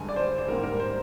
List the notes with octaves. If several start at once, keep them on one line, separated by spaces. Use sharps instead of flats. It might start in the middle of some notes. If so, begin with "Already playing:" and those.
Already playing: G2 D3 G#3 G#5
D5
C5
C5
G#2 G3 A#3 A#4
A#4
C5